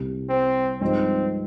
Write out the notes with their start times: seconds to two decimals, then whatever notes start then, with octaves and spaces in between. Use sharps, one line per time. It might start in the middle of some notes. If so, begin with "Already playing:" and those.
Already playing: C2 C3 G3
0.29 C4
0.81 G2 F3 G#3 C4 D#4 G4